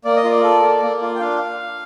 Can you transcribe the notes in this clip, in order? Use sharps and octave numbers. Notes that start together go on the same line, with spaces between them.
A#3 D5
D#5
F4 D5
A4
A#3
A#3
F4
G5
D4 F5